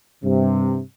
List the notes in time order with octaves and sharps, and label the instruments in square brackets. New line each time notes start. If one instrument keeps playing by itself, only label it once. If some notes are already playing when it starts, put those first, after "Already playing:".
[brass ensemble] G2 C3